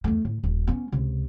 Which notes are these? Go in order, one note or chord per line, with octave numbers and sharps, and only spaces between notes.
E2 A3
A2
D#1
B3 C#4
C#2 C3